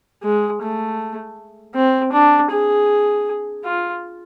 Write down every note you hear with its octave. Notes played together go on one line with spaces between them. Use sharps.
G#3
A3
C4
D4
G#4
F4